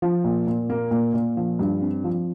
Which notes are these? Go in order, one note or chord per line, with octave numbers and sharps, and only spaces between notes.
F3
A#2
A#2
A#3
A#2
A#2
F3
G2
C4
F3